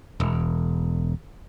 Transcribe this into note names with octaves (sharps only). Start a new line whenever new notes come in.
E1